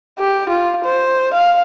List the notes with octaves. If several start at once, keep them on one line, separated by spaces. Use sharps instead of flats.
G4
F4
C5
F5